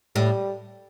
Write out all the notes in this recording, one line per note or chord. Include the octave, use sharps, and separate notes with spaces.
A2 G3